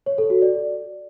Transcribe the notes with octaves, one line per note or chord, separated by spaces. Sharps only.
C#5
A4
F#4
D5